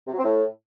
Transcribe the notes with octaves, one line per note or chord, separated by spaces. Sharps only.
C3
F#3
C4
A2